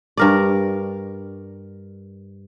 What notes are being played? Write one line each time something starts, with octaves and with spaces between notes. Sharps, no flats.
G2 A#4 D5